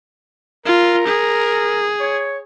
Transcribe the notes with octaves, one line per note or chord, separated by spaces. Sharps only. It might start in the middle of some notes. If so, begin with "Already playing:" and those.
F4 A#4
G#4
C#5